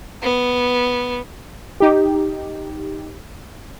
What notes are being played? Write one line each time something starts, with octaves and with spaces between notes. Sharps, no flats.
B3
D#4 G4